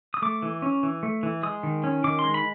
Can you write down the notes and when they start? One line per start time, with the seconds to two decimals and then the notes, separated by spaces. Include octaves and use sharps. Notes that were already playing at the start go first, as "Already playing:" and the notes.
0.14 D#6
0.22 A3 D6
0.42 E3
0.62 C#4
0.83 E3
1.03 A3
1.23 E3
1.43 G#3 D#6
1.63 D#3
1.84 C#4
2.04 D#3 D6
2.19 C6
2.24 G#3
2.34 B5